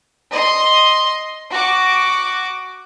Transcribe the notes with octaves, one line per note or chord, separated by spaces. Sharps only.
D#5 C6
F#4 D6